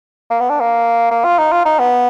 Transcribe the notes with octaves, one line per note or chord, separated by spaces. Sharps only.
A#3
B3
D4
A#3
A#3
F4
D#4
F4
D#4
B3